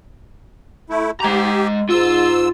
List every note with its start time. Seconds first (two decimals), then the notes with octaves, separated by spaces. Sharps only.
0.90 A3 E4
1.20 G#3 G4 A#5
1.90 G#2 F4 E6